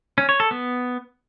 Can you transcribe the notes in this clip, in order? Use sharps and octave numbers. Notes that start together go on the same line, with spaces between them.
C#4
C#5
A4
B3